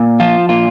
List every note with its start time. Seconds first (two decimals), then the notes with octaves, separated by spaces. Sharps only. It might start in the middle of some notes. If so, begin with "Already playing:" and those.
Already playing: A#2
0.20 F3 F4
0.49 A#2 F4